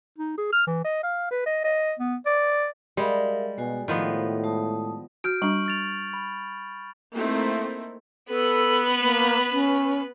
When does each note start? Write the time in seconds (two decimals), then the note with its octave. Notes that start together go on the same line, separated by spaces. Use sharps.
0.18 D#4
0.38 G#4
0.52 F6
0.67 E3
0.84 D#5
1.03 F5
1.31 B4
1.46 D#5
1.64 D#5
1.99 B3
2.26 D5
2.97 G3 G#3 A#4 E5 F5
3.58 B2 G#3 F#4 G#5
3.88 A2 D#3 F3 B3 C5 F5
4.44 G#3 A5 D#6
5.24 F#4 F6 G6 D7
5.42 G3 D4 C#6 F6 F#7
5.66 F6 A6 F7
6.13 B5
7.14 A3 A#3 C4 D#4 E4
8.30 B3 A4 B4
9.01 A#3
9.51 C#4